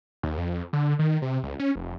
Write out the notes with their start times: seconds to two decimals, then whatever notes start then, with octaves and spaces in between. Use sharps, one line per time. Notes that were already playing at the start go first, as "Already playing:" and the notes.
0.23 D#2
0.38 F2
0.73 D3
0.99 D#3
1.22 C3
1.43 C#2
1.60 C#4
1.76 F1